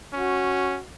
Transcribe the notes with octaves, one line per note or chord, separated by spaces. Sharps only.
C#4 F#4